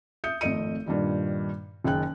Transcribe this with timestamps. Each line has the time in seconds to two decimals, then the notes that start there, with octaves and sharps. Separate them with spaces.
0.24 E5 D#6 G6 C#7
0.41 G#1 F2 A3 D#5 C#7 D#7
0.86 G2 A#2 D#3 G3
1.84 F#1 D#3 G#4 G5 F#6